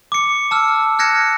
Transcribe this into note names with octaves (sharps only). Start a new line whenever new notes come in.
D6 C#7
A5 E6 F6
F6 F#6 G#6 A#6 C#7 E7